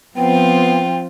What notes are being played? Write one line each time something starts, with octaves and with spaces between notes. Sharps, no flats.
F3 B3 C4 F4 G5